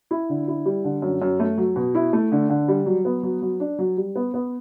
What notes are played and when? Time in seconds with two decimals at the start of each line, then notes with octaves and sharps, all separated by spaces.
0.11 E4
0.29 D3
0.48 E4
0.65 G3
0.84 D3
1.02 F#2
1.22 F#2
1.40 A3
1.58 F#3
1.76 B2
1.95 E4
2.13 A3
2.32 D3
2.50 D3
2.68 G3
2.86 F#3
3.05 B3
3.23 F#3
3.42 F#3
3.60 D4
3.79 F#3
3.97 G3
4.16 B3
4.34 B3